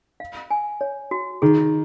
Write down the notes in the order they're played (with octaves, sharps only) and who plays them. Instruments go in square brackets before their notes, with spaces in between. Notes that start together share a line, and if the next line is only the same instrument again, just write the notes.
[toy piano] F5
G#5
C#5
F#4
[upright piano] D#3 [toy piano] G#4